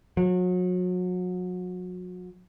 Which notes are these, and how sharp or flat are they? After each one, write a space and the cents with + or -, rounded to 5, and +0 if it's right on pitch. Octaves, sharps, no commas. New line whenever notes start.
F#3 -35